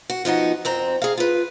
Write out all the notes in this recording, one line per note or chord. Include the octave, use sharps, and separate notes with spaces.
F#4
F3 B3 D#4 F#4
F2 C4 A#5
G#4 F5
F4 B4